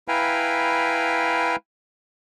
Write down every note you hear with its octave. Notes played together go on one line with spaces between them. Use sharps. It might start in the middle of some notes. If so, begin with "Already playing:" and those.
E4 B4 F5 G5 G#5 A#5